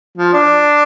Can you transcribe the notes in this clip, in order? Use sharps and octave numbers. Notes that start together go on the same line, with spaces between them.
F3
D4